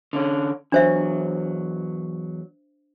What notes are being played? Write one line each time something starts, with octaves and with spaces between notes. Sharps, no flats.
D3 C#4
E2 F#3 D4 C5 E5